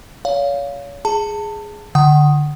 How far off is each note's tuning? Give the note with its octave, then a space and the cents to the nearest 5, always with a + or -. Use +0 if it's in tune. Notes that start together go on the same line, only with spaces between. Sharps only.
C#5 +35 F5 +0
G#4 +0 A5 +25
D3 +0 F#5 +25 D#6 +0